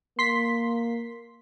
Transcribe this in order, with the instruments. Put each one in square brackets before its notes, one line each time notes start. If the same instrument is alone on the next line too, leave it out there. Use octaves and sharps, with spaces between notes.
[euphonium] A#3 [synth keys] C6 B6